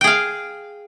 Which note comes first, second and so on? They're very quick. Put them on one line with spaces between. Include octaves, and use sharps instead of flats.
G5 G#4 F5